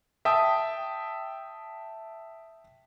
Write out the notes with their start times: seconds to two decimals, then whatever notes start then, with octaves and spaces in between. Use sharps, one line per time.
0.25 E5 G5 A5 D#6